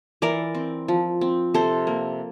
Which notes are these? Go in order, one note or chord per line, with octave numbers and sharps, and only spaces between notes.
E3 A#4 D5
C4
F3
C4
C3 A4 C5
A#3